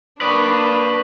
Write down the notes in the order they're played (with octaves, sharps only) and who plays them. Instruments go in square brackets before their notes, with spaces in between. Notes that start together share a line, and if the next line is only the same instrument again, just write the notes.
[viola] A#3 D4 [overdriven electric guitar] B4 D5 [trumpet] B5 [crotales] C#6 D#6